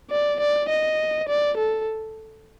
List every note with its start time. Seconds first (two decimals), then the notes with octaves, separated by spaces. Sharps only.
0.11 D5
0.40 D5
0.69 D#5
1.29 D5
1.57 A4